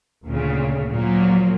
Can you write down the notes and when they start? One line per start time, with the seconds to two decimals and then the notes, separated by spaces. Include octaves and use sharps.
0.25 D2 A#2 C#3
0.91 A#2 F3 F#3 A#3